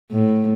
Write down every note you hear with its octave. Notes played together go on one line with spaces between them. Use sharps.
A2